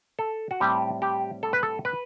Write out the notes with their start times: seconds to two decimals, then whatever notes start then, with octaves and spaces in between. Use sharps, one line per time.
0.19 A4
0.51 F#4
0.60 A2 G3 C4 G4
1.02 G4
1.43 A4
1.53 B4
1.63 A4
1.85 B4